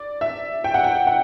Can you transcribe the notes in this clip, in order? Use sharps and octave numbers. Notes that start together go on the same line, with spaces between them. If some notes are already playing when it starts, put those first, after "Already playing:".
Already playing: D5
E5
G5
F#5
G5
F#5